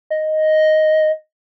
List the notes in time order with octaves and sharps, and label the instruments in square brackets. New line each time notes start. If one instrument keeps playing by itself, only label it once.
[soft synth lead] D#5